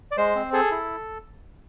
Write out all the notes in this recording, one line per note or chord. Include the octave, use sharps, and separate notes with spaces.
D5
G#3 C5
C4
G#4 A4
E4